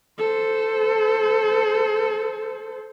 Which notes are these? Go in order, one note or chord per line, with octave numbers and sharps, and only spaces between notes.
A4 C5